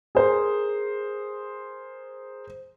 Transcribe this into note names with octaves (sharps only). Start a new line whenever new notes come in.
G#4 A#4 C5